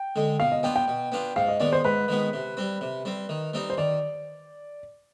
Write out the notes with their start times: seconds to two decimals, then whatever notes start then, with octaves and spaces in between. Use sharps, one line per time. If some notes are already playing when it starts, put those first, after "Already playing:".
Already playing: G5
0.16 D3 G#3
0.40 B2 F5
0.52 D#5
0.63 B3 D4 F4 G5
0.76 G5
0.88 B2
1.12 B3 D4 F4
1.36 G#2 F5
1.48 D#5
1.60 D#3 G#3 B3 D5
1.73 C5
1.84 G#2 B4
2.08 D#3 G#3 B3
2.33 C3
2.57 G3 C4
2.81 C3
3.05 G3 C4
3.29 D#3
3.54 G3 C4 D#4
3.70 C5
3.77 D#3 D5